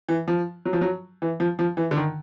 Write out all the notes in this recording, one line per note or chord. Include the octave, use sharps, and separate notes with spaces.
E3
F3
F#3
F3
F#3
E3
F3
F3
E3
D3
D#3